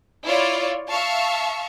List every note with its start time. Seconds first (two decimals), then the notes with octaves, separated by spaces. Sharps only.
0.25 E4 F4 C#5 D5
0.90 E5 F5 A5 C#6